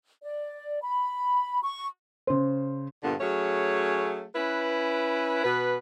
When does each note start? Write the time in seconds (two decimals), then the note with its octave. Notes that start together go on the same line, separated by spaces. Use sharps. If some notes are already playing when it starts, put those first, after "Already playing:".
0.22 D5
0.83 B5
1.63 C#6
2.27 C#3 C5
3.04 G2 A#2 D3 B3 D4
3.21 F#3 A3 C#4 G#4 C#5
4.36 C#4 E4 B4
5.44 B2 B4